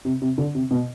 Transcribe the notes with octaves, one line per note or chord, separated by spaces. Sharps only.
C3
C3
D3
C3
B2